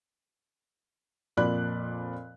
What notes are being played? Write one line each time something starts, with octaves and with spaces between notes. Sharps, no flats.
F2 A#2 F3 D5 B5 F#6